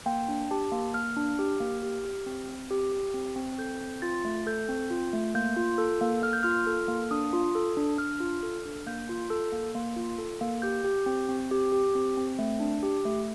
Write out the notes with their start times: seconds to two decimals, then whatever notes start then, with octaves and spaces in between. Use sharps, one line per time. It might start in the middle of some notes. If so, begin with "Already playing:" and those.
0.06 A#3 G5
0.28 D4
0.51 G4 A5
0.72 A#3
0.94 A#3 F6
1.17 D4
1.39 G4
1.60 A#3
1.83 G4
2.05 G4
2.26 C4
2.49 C4
2.71 G4
2.92 G4
3.14 C4
3.36 C4
3.58 A4 G6
3.81 C4
4.02 F4 A6
4.25 A3
4.46 A4 G6
4.69 C4
4.90 F4
5.13 A3
5.35 A#3 G6
5.57 F4
5.78 A4
6.01 A#3
6.23 A#3 F6
6.33 G6
6.43 F4 F6
6.67 A4
6.88 A#3
7.11 D4 D#6
7.33 F4
7.55 A4
7.77 D4
7.98 D4 F6
8.20 F4
8.43 A4
8.65 D4
8.86 A#3 G6
9.09 F4
9.30 A4
9.52 A#3
9.75 A#3
9.96 F4
10.18 A4
10.41 A#3
10.62 G4 G6
10.84 G4
11.06 C4
11.29 C4
11.51 G4
11.72 G4
11.95 C4
12.17 C4
12.39 A3
12.60 D4
12.83 G4
13.05 A3